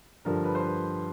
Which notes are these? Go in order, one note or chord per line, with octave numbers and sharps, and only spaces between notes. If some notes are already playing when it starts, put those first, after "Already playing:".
G2 D3 F3 A#4
B4
C5
B4